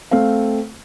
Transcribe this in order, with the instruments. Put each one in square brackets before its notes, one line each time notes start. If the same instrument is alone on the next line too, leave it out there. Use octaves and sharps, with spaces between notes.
[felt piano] A3 C4 F5